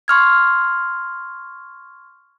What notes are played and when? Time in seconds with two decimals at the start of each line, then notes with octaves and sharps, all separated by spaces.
0.08 C6 C#6 F6 G#6